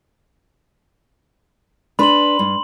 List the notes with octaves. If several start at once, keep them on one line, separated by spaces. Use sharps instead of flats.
D4 B4 B5 C6 F#7
G2